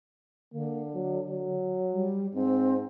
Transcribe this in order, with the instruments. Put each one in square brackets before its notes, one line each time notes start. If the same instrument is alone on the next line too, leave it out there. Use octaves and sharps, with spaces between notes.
[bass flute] D3 [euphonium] A#3
[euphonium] F#3
F#3
[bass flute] G3
[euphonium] G#2 [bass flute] C4